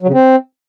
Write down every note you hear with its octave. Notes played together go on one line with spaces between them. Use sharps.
F#3
C#3
C4